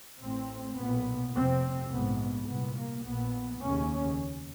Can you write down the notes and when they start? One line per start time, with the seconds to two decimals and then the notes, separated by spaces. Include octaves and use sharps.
0.21 A1 A2 C4
0.78 B1 A#2 B3
1.35 F1 F2 C3 C4
1.91 A#1 G#2 B3
2.48 C2 A#2 B3
2.77 A#3
3.05 A#1 A#2 B3
3.62 F1 D#2 C#3 C#4